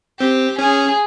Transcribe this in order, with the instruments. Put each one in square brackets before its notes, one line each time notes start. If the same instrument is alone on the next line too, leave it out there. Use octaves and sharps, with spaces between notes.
[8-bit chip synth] C4 [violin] G4
[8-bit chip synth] C#4 [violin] G#4